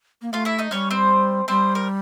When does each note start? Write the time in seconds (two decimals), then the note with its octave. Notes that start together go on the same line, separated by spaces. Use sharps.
0.22 A#3
0.33 A3 F4 F5
0.45 E4 E5
0.58 D#4 D#5
0.71 G3 C#4 C#5
0.91 C4 C5
1.48 G3 C4 C5
1.75 A#4